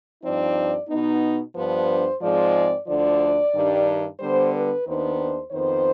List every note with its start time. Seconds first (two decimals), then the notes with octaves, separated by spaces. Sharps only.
0.22 G2 F3 C4 D#4 D5
0.89 B2 B3 D#4
1.55 G2 F3 B3 D4 C5
2.21 G#2 F3 G#3 C4 D5
2.87 D2 D3 F3 D5
3.53 G2 D#3 G3 D4
4.19 D3 G3 B3 C5
4.52 B4
4.85 D#2 D#3 B3 D4 C5
5.52 F2 D#3 B3 C5